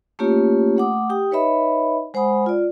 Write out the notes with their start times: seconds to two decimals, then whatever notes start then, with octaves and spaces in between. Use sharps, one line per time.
0.19 A3 A#3 C#4 F4 G4 C#5
0.77 A3 F#5 D6 D#6
1.10 G4 G5 D#6
1.31 D#4 B4 C#5 D#5 E5 B5
2.14 G#3 C5 F#5 G#5 B5 D#6
2.46 F4 D5